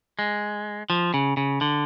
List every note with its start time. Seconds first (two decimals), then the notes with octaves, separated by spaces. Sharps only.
0.19 G#3
0.90 F3
1.14 C#3
1.37 C#3
1.61 D3